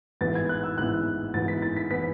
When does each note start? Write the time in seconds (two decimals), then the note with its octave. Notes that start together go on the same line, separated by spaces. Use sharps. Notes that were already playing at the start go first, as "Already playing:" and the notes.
0.21 A1 G#2 E3 B3 A6
0.35 G#6
0.49 F#6
0.63 E6
0.78 A1 G#2 E3 B3 F#6
1.34 A1 G#2 E3 B3 A6
1.48 B6
1.62 A6
1.76 B6
1.90 E3 B3 B6